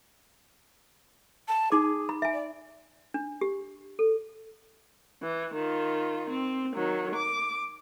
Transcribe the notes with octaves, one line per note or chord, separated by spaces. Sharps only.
A5
D#4 G#4 D6
B5
E5 G#5
D5
D4
G4
A4
E3
D#3 F4
C4
D#3 F#3
D6